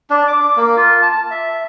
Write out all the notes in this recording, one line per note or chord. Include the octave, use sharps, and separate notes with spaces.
D4
D6
A#3
F4
A5
E5